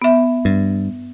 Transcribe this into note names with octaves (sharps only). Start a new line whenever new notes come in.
B3 E5
G2